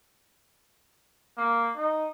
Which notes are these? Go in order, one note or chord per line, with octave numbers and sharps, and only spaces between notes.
A#3
D#4